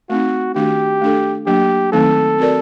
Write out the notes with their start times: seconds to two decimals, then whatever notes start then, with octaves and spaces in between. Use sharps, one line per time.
0.10 A3 C4 D#4 F#4
0.55 D#3 A3 D4 F#4 G4
1.01 A3 D4 A4
1.46 F#3 A#3 D4 G4
1.92 D#3 F#3 A3 C4 D#4 A4
2.38 C4 F#4 A#4 D5